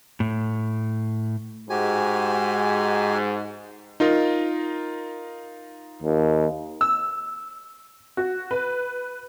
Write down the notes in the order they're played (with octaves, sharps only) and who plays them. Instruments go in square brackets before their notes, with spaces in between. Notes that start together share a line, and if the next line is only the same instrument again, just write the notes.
[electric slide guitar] A2
[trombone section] G#2 G#3 [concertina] F#4 G4 G#5
[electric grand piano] D#4 F4 A#4
[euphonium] D#2
[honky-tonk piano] E6
F#4
B4